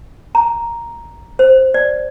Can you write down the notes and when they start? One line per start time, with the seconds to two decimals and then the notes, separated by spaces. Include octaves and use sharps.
0.35 A#5
1.39 C5
1.74 D5